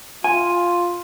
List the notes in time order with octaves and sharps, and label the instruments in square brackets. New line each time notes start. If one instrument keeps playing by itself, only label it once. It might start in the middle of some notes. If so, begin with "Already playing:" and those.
[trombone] F4 [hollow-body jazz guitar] G#5